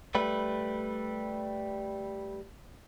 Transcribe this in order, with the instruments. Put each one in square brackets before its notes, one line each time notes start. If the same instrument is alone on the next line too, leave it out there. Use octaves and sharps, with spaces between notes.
[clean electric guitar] G3 A3 B4